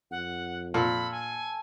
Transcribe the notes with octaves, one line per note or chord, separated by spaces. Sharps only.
F2 F#5
A#2 A4 B5
G#5